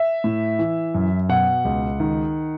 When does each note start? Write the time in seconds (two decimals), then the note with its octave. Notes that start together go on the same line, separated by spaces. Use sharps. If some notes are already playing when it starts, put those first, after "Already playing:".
Already playing: E5
0.24 A2
0.59 E3
0.95 F#2
1.29 B2 F#5
1.65 C#2
2.00 D#3